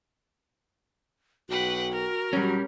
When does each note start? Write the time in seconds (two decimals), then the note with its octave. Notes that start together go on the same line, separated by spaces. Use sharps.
1.49 B1 F#4 B4 F#5 G5
1.91 A#4
2.33 F#3 G3 C#4